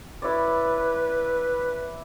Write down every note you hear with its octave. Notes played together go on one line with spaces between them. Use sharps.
E4 B4 C#5 D5